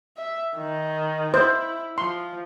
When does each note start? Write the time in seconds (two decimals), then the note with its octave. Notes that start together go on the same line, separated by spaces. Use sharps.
0.17 E5
0.57 D#3
1.34 E4 C5
1.98 F3 C6